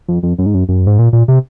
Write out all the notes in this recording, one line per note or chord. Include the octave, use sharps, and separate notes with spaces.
F2
F2
F#2
G#2
F#2
F#2
G#2
A#2
A#2
C3